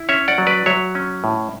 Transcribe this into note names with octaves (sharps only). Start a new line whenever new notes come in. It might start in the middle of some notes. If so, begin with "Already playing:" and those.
Already playing: E4
C#4 C#5 E5
D5 F#5
F#3
B4 D5
F#3 C#5 E5
C#4
A2